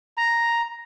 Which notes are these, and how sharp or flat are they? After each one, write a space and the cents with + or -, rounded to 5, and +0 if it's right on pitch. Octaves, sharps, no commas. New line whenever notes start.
A#5 +0